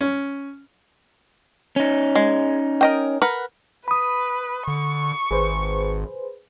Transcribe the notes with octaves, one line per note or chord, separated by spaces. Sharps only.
C#4
C#4 D#4
G#3
A#4 D#5 G5
A#4 B4 F#5
B4 B5 D#6
D3 C#6
G#1 G#4 B4 C5